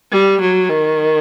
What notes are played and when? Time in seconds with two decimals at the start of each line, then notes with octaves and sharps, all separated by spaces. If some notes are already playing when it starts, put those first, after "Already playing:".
0.11 G3
0.41 F#3
0.70 D#3